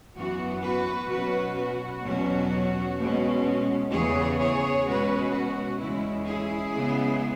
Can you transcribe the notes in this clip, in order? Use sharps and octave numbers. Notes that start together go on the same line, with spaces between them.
F#2 E3 B3 F#4
F#4 B4
B2 F#3 C#4 F#4 B4
F#4
E2 B2 F#3 C#4
B2 G#3 C#4
E2 C#3 E3 B3 G#4 C#5
G#4 C#5
B2 G#3 C#4 F#4 B4
F#4
E2 C#3 G#3 C#4 E4
E4 G#4
C#3 G#3 B3